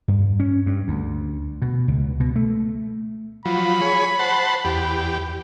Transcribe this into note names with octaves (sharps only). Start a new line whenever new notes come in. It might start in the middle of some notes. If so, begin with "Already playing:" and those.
G2
C#4
G2
D2
B2
C#2
B2
A3
F3 F#3 B5
G#4 C#5
C5 F#5 A5
E2 G4